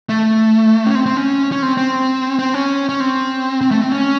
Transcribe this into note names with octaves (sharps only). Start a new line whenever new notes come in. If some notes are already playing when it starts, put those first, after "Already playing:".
A3
C#4
C4
C4
C#4
C#4
C4
C4
C4
C#4
C#4
C4
C4
A3
C4
C#4